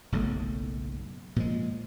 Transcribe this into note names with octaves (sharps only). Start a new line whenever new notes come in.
F#1 B1 A2 A3
A#2 F3 G#3